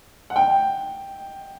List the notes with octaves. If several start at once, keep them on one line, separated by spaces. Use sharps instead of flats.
F#5
G5